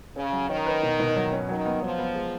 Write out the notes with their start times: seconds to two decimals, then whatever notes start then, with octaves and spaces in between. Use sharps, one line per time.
0.16 C#3 C#4
0.32 F#3
0.49 D#3 C#4
0.67 B4
0.83 B2
1.00 B2
1.16 F#3
1.33 C#4
1.49 D#3 F#3
1.65 B3
1.82 F3 F#3
1.98 B3
2.15 G#3